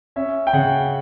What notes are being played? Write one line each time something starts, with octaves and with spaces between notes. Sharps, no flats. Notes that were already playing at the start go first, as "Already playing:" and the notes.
C#4 E5
G5
C#3 F#5